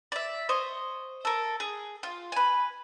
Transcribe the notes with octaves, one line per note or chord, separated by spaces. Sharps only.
D5 E5
C5 C#5 D#5
A4 A#4
G#4
F4
B4 G#5